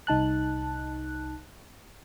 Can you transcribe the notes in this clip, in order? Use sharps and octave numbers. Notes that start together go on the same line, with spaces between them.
C2 D#4 A5 F#6